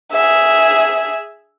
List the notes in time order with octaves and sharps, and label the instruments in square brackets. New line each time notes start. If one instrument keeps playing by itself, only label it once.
[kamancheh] G#4 E5